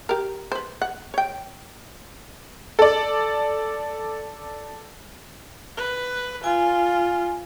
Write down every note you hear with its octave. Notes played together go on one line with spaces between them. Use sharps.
G4 A#4
B4 C5
F#5
C#5 G5
A4 D5
B4
F4 G#5